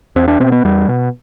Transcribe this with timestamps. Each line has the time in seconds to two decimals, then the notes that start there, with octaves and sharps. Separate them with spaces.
0.16 E2 C4
0.28 D4
0.40 B2 C4
0.52 B3
0.64 E2 G3
0.88 B2